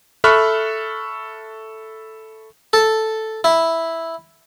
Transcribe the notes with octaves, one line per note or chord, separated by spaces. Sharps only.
A4 E5 B5 C#6 F6 F#6
A4
E4